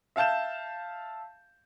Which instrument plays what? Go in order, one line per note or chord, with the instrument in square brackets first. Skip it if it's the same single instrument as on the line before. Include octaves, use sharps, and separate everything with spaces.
[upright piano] E5 F5 A5 G6 E7